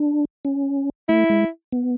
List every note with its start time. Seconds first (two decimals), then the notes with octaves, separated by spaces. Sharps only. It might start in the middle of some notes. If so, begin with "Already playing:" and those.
Already playing: D4
0.45 C#4
1.09 A3 E4
1.30 G#3
1.72 B3